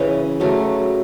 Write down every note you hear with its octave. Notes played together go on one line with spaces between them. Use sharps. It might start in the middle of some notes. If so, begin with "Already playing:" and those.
Already playing: C#3 E3 C#4 E4
C#3 F#3 A3